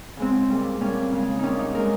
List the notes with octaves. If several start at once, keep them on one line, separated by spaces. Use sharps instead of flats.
C#3 G#3 C4
A#2 G3
A#2 G3 C#4
C#3 G#3
A#2 G3 C#4 D#4
D#4
A#2 G#3 A#4